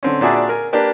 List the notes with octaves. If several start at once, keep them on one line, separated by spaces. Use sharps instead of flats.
D3 C4 C#4
A#2 D4 F#4 G#4 D5 E5
A#4 G#5
A#3 D4 G4 B4